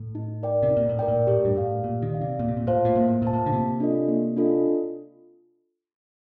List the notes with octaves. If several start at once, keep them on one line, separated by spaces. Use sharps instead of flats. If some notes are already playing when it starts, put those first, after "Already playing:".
Already playing: A2
D#4
A#4 D5 G5
C3
D#4
A#2
A2
A#4 D5 G5
A#2
A2 G4
G2
A2 D5 F5
A#2 G4
D#3
D5 F5
C3
A#2 A#3
C3
A#2
A2 F4 C5 F5 A5
A#2
A2 A#3
A#2 F4 C5 F5 A5
A2
D3
C3 A#3
D4 F4 A4 D#5
A#3
D4 F4 A4 D#5